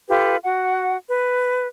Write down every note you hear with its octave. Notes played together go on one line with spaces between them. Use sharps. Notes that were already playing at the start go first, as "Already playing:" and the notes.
F4 G4 A4 B4
F#4 F#5
B4